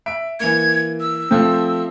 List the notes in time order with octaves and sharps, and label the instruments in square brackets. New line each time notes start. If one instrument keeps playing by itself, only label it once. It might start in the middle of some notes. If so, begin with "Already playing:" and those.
[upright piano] E5 D7
[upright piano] E3 A#3 [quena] G#6
[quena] E6
[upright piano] F3 A3 C4